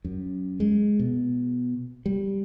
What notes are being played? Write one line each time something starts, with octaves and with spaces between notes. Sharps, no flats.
F#2
G#3
B2
G3